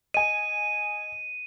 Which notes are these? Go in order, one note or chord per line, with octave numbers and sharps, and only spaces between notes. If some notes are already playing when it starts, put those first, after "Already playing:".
D#5 G#5 D#7